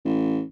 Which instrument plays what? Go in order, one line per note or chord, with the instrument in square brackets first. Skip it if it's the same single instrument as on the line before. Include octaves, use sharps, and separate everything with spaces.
[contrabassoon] A1